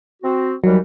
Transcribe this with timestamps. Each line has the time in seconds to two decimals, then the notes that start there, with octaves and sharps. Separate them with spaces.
0.23 C4 F#4
0.64 D#2 E3 F#3 G3